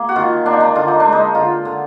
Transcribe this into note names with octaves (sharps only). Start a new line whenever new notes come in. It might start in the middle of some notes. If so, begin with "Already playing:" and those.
Already playing: A#3 G#4
F#4
D#3 F4
A#3 D4
D#4
D4
D3 F4
D#4
D4
G#3
D#4
D3 F4
D3